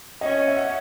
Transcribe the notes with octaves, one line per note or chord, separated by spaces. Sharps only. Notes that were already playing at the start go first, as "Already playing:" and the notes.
C#4 D#5
E5
F#5
E5